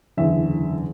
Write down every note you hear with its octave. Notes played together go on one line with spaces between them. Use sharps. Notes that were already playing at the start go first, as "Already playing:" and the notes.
F#1 E2 D3 E5